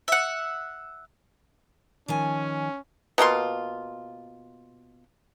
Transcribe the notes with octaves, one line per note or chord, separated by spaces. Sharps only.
E5 F#5
D#3 F3 C#4 G#5
B2 A#3 F4 C6